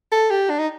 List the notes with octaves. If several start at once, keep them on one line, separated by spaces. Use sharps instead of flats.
A4
G4
D4
D#4